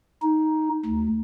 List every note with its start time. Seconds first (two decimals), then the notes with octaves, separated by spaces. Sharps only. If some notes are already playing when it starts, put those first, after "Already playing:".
0.23 D#4
0.86 D2